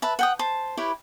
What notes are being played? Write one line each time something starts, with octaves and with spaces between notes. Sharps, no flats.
B4 E5 A5
F#5 G5 D#6
C5 A5
E4 G4 B4 C#5